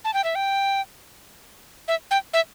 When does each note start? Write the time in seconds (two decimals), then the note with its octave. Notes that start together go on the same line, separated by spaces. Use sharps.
0.05 A5
0.14 G5
0.24 E5
0.35 G5
1.88 E5
2.11 G5
2.33 E5